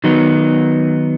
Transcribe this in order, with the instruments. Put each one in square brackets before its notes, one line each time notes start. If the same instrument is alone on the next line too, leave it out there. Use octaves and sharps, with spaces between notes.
[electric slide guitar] D#3 F#3 B3 D#4